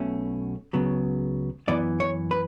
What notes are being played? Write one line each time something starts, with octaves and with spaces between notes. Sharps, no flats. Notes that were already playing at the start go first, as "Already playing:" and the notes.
Already playing: B1 B2 A3 C#4
C#2 C#3 F#3 B3
F#2 E3 B3 D5
C#5
B4